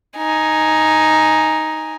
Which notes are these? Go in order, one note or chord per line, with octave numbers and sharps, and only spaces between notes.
D#4 G#5